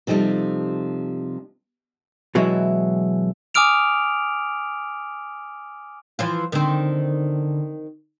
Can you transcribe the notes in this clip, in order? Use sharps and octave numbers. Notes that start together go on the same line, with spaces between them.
C3 F3 G3 D#4 A4
B2 E3 F#3 G#3 E4
G#5 D6 D#6 F6 D7 F7
E3 F3 F4
D3 D#3 C4